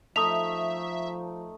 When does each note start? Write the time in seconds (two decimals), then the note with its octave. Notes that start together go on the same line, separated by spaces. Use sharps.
0.16 F3 A3 D#4 E5 D#6 F7